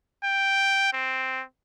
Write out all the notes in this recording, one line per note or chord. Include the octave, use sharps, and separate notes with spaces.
G5
C4